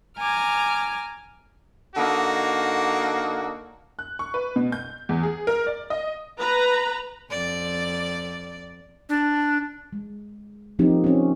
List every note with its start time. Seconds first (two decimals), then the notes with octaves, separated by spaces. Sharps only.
0.19 G#5 A#5 D6 F6
1.96 D3 A#3 D#4 F#4
3.99 F#6
4.19 C#6
4.34 B4
4.56 B2
4.72 G6
5.09 E2
5.23 G#4
5.47 A#4
5.67 D5
5.90 D#5
6.39 B4 A#5
7.30 F2 D5
9.09 D4
9.93 G#3
10.79 F3 A#3 C4 D#4 G4
11.04 C4 C#4